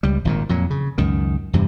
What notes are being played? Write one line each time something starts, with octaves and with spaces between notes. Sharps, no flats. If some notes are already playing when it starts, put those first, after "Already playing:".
C#2 G3
G#1 A#2 D#3
F2 A#2 F#3
C#3
C#2 F#2 D#3
E2 G2 C3